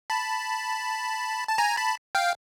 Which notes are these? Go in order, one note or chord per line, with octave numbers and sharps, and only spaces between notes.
A5 B5
A5
G#5 A#5
A5 B5
F5 G5